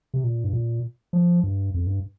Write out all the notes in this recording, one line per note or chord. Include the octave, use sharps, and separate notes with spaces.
C3
A#2
G2
A#2
F3
G2
F2
G2